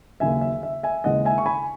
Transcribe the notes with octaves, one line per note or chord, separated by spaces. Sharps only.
D#2 C#3 F#3 E5 G#5
E5
E5
E5 G#5
D#2 C#3 E3 G#3 D#5 F#5
E5 G#5
C#6
G#5 B5